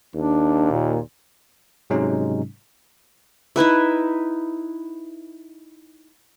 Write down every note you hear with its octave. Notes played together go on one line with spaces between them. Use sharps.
D#2 D4
A#2
G#2 C3 F#3 G#3 C#4 D#4
D#4 E4 B4 E5